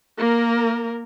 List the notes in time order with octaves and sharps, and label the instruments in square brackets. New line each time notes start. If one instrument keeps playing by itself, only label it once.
[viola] A#3 A#4